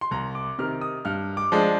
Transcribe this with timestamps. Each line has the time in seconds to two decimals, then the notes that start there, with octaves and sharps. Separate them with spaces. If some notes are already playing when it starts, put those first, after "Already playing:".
0.01 C6
0.11 C2 A#5
0.35 D6
0.59 C3 D#3 F6
0.81 D#6
1.05 G2 F6
1.37 D6
1.52 F3 G#3 D4